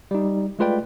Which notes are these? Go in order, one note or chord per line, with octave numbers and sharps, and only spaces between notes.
G3 D#4
G#3 A3 F4 B4 D5 G5